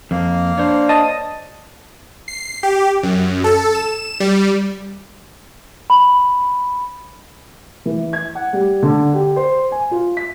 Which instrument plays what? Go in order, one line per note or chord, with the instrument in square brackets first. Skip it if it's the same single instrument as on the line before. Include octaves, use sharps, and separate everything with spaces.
[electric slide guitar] F2 [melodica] A#3
[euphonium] D4 [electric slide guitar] C5 C#5
[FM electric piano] D#5 A5 D#6
[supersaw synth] C7
G4
F#2
A4
E7
G3
[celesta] B5
[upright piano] E3
G#6
F#5
G3
D3
G4
C5
G#5
F4
B6